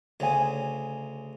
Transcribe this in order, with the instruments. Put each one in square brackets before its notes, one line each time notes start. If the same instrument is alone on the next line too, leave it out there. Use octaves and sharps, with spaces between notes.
[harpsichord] D2 C#3 [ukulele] C#5 G#5